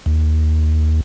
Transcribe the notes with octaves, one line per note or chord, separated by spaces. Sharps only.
D#2